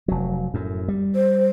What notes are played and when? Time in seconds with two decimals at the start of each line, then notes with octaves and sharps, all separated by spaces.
0.08 F1 F#3
0.54 F#2 A2
0.88 G3
1.15 C5